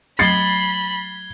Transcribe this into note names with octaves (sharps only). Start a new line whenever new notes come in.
F#3 A3 B5 G#6 A6 C7 G7